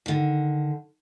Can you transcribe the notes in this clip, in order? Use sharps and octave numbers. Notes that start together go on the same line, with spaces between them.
D3 D#3